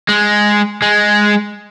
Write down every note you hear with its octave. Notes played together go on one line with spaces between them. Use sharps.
G#3
G#3